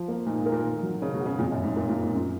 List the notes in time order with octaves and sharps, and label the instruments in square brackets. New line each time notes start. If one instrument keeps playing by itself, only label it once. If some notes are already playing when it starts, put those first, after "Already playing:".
Already playing: [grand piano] F3
A#3
[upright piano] A#2 [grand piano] D#4
[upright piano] G#2
[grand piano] A#4
[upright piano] A#2
[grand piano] D#3
F#3
[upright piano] C#3 [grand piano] C#4
[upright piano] B2
[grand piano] F#4
[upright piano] C#3
[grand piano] F2 [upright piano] A#2
[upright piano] F#2
[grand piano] D#3
[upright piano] G#2
[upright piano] A#2 [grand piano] A#3
[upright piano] A#2
[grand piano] F4
[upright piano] G#2
[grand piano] F#2